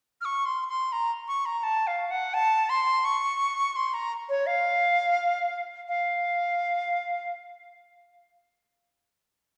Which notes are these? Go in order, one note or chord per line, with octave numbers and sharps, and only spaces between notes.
F6
C#6
C6
C6
A#5
C#6
A#5
A5
F5
F#5
A5
C6
C#6
C6
A#5
C#5
F5
F5